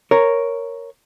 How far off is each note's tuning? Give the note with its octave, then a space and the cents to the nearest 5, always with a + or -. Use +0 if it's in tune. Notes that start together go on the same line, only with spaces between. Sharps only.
A#4 +0 C#5 +0